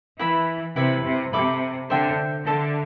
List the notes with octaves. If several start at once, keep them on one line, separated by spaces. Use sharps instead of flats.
E3 E4 B4 E5 B5
C3 E4 B4 E5
C3
C3 A4 E5 B5 D6
D3 C5 E5 G5
D3 A4 E5 A5 C6